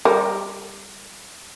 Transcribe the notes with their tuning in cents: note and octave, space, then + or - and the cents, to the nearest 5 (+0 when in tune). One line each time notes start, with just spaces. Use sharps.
G3 +10 A#4 +0